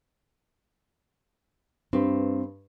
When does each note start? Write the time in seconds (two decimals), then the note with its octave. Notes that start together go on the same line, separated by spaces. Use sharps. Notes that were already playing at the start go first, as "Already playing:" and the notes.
1.93 G2 C4 B4